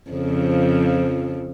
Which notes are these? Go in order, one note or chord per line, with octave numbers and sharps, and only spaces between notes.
F2 C#3 F3